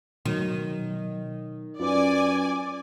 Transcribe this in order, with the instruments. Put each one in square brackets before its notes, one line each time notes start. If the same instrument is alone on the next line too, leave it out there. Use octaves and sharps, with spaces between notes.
[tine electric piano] B2 F#3 [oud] D#3
[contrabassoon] F#2 [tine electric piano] F4 B4 [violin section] D5 G#5